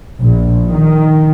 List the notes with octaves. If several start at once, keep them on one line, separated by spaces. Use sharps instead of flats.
A#1
D#3